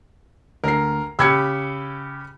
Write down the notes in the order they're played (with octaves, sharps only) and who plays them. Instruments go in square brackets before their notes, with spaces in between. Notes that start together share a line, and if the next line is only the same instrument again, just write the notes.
[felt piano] D2 C7 [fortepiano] A#4
[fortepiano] C#3 G4 E6 [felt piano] B5 G#6 C#7